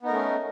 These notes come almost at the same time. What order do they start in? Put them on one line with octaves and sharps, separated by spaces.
B3 D#4 A#4 A3 C#4